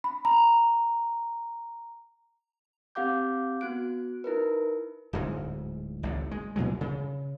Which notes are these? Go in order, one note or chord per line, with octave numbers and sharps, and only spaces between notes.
B5
A#5
C4 G4 F5 F#5 D6 G6
B3 F#4 F#6 D7
D#4 E4 A#4 B4
D1 D2 G#2 G#3
G#1 C#2 A2
G#3
A#2 E3 F#3 G#3
C#3